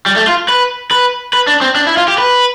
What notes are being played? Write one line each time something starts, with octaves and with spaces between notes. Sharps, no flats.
G3
A3
F4
B4
B4
B4
D4
C4
D4
E4
F4
G4
B4